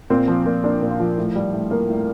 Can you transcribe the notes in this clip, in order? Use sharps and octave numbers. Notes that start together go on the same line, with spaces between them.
A#2 C4
F3
A#2
A#3 D4
A#2
F4
F3
A2
G3
A2
A#3
A2